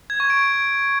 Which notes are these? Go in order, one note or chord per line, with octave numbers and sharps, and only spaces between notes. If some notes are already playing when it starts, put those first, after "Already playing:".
G#6
C#6
D7